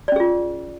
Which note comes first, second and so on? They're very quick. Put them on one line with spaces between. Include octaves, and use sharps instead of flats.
D5 C#4 G#4 F4